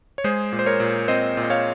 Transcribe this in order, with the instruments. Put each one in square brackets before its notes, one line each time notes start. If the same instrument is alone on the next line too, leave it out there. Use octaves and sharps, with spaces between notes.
[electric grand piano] C#5
G#3 G#4 C5
A#2
C5
A#4 C#5
A#2
C4 C5 D#5
A#2
D#5
C#5 F5